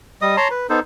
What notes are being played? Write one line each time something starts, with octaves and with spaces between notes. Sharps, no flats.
G3 D#5 D#6
C#5 A5 A#5 C6
B4
B3 D#4 A4 C5